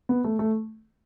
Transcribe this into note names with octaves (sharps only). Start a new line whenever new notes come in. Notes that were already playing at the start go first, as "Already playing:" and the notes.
B3
A3
A3